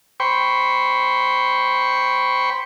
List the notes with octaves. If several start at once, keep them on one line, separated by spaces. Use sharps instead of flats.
C5 G5 B5 C#6